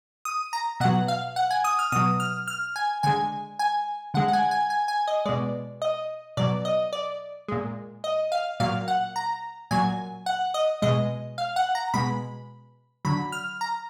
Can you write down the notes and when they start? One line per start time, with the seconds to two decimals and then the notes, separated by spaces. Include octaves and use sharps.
0.25 D#6
0.53 A#5
0.80 B2 F#3 F#5
1.08 F5
1.36 F#5
1.51 G#5
1.64 D#6
1.79 F6
1.92 B2 F#3 D#6
2.20 F6
2.48 F6
2.76 G#5
3.03 D3 G#3 G#5
3.59 G#5
4.14 D3 G#3 F#5
4.28 F#5
4.33 G#5
4.51 G#5
4.70 G#5
4.88 G#5
5.08 D#5
5.25 B2 G#3 D5
5.82 D#5
6.37 B2 F#3 D5
6.65 D#5
6.93 D5
7.48 A#2 G#3
8.04 D#5
8.32 F5
8.60 A#2 F#3 F5
8.88 F#5
9.16 A#5
9.71 A#2 F#3 G#5
10.26 F#5
10.54 D#5
10.82 B2 G#3 D#5
11.38 F5
11.56 F#5
11.75 A#5
11.94 B2 G#3 B5
13.05 D3 F#3 B5
13.32 F6
13.61 A#5